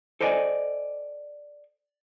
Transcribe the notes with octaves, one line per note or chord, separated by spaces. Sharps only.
A4 C5 D5 D#5 F5 G#5